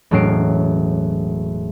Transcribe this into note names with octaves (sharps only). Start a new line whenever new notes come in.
E1 A2 F#3 C#4 C7 D7